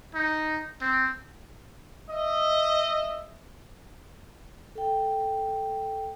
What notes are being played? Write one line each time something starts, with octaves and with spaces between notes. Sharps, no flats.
D#4
C4
D#5 E5
A4 G5